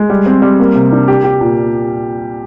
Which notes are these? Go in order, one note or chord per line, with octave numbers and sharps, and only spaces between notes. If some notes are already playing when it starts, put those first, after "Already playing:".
Already playing: G#3
G3
C4
G3
A#3
C3
D4
G4
G4
A#2